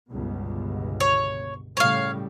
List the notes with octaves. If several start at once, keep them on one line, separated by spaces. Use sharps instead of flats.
G1 C#2 B2
C#5
A2 C#3 G3 C#5 F5